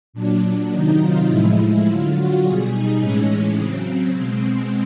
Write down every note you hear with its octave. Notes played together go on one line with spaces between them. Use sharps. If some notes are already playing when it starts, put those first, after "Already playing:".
A#2 F#3 D4
C3 D#3 F#3 D#4
F4
A2 F3 G#3 E4
D3 F#3 F4
F#4
B2 G3 G#4
D#4
A2 E3 G#3 C#4
C#4
C#3 F#3 C4
B2 G#3 C4